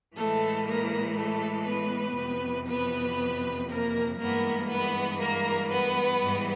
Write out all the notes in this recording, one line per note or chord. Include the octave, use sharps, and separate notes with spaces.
A2 E3 G#3 A3 A4
A#3 A#4
A3 A4
B3 B4
F2 C3 E3
B3 B4
A#3 A#4
G2 E3 G#3 A#3 B3 A#4
B3 B4
A#3 A#4
B3 B4
G#2 E3 G3